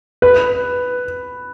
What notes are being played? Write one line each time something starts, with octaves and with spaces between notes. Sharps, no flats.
B4